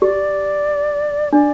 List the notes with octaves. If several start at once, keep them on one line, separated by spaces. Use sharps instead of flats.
G4 D5
D4 D5